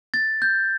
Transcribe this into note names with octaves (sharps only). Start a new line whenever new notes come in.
A6
G6